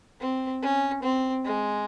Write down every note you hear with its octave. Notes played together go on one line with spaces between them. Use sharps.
C4
C#4
C4
G#3